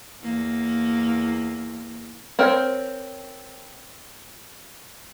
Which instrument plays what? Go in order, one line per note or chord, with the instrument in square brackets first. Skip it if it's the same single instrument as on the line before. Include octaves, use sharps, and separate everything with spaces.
[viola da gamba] E2 A#3
[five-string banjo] C4 A#4 C5 C#5 G5